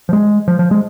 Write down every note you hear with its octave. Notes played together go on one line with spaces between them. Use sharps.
F3
G#3
F3
F3
G#3